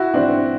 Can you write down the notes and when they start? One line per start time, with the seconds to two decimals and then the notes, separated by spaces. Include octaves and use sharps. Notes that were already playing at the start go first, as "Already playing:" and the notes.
Already playing: E4 F#4
0.14 C4 D4